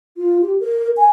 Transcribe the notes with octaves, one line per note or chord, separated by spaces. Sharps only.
F4
G4
A#4
G#5